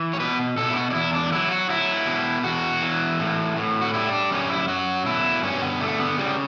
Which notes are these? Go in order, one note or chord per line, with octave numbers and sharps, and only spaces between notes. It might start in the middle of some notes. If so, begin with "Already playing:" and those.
Already playing: E3
C#5
B2 B4
B2 A4
E4
F#4
D4
E2 E4
D4
F#3 E4
F#4
F#3 E4
B2
E2 F#4
E3
A2
A2
F#4
G3 E4
D4
F#2 C#4
E4
F#3 F#4
B2 E4
G2 C#4
B3
D3 A3
B3
C#3 G3